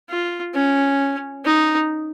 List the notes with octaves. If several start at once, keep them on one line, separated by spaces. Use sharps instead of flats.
F4
C#4
D#4